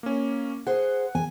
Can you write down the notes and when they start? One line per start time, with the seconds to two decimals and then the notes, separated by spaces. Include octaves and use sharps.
0.03 A#3 C#4
0.67 G#4 C5 F#5
1.15 E2 G#5